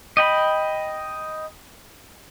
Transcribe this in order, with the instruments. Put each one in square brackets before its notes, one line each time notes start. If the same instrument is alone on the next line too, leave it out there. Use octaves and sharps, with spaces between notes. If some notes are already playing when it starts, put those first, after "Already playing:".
[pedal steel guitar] D#5 G5 B5